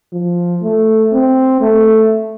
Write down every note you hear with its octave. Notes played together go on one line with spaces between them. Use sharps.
F3
A3
C4
A3